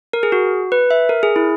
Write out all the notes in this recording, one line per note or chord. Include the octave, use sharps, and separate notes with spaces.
A#4
G#4
F#4
B4
E5
A#4
G#4
E4